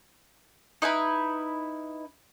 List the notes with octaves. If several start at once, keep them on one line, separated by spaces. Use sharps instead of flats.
D#4 E4 B4 B5